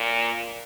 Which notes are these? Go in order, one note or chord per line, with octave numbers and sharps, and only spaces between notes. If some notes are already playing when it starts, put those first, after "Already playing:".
Already playing: A#2